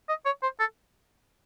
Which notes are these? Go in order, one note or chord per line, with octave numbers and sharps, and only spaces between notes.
D#5
C#5
C5
A4